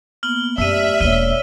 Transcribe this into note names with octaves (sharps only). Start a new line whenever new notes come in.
A#3 B3 F6 F#7 G7
F#2 A3 G4 D5 E5 E6 D#7
E1 A#3 C#5 D5 F6 D#7 G7